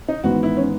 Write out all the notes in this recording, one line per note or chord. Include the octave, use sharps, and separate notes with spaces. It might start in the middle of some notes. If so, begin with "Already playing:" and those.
D#4
G#1 G#2 E3 B3 F#4
E4
C#4